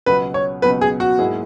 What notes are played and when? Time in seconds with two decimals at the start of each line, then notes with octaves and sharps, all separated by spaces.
0.06 C#2 B2 F#3 B3 B4
0.34 C#5
0.62 C#2 B2 F#3 B3 B4
0.81 G#4
1.00 F#4
1.19 G#2 F#3 A#3 E4 G#4